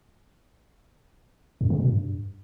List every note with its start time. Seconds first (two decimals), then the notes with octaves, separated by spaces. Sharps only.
1.61 F#2
1.70 C#3
1.80 B2
1.89 G2